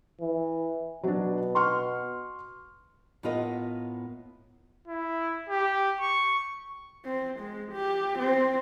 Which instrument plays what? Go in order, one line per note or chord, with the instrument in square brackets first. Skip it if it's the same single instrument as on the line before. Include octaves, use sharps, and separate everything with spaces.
[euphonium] E3
[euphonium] B2 [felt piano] F#3 D4
[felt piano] C6 C#6 F6
[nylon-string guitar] A2 B3 F4 A#4 D#5
[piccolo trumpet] E4
G4
C#6
[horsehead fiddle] C4
G#3
G4
C4